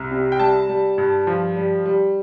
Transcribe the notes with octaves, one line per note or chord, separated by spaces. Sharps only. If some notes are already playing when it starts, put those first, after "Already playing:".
Already playing: C2
C3
G5
G3 A5
G3
G2
F3
G3
G3